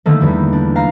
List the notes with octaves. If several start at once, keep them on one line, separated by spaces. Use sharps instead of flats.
D3 D#3 A3 A#3
E2 G3
D4
F5 A#5